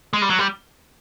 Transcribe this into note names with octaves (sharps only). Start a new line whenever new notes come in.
G#3
G3
F#3
G3